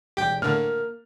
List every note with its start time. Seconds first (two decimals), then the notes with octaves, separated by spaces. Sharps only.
0.17 E1 G4 G5
0.42 A2 D3 A#3 F6